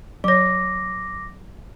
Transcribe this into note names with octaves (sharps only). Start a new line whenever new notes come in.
F#3 C#5 D6 A#6